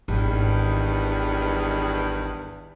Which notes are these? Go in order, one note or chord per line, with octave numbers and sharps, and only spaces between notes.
G#1 E2 G2 D#3